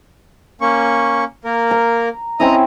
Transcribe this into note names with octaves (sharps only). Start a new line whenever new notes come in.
A#3 C#4 C#6
A#3 A#4
A#5
C4 C#4 E4 D#5 A#5 D#6